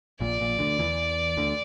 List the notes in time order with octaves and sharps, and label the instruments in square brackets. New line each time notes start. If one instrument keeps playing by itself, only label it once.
[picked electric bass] A#1 A#2 [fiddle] D5
[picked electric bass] A#1 A#2
D2 D3
E2 E3
D2 D3